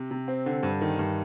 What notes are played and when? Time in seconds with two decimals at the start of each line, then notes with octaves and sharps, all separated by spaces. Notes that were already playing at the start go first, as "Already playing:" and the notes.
Already playing: C3
0.11 C3
0.28 C4
0.46 D3
0.63 G2
0.81 D#3
0.99 G2